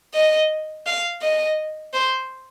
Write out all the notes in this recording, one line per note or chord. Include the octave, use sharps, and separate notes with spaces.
D#5
F5
D#5
C5